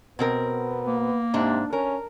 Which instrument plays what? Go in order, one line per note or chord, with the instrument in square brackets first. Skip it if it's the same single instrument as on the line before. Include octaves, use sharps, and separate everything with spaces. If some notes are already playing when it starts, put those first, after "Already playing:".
[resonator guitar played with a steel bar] B2 C4 A#4 [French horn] B3
[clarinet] A#3
[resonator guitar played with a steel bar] G#2 D4 [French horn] C3
[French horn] C#4 [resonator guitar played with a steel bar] A#4